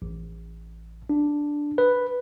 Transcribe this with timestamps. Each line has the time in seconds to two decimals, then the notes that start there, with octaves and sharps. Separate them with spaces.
0.02 A1
1.10 D4
1.78 B4